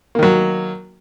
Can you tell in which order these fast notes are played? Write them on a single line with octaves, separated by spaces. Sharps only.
A#3 D#3 F#3